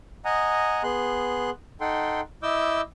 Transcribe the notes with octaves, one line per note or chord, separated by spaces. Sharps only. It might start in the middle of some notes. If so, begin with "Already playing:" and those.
D#5 F#5 G#5 A#5 D#6
B3 G#4 C6 F#6
D#4 A4 F#5 G5 C6
E4 D#5 D6 E6 G6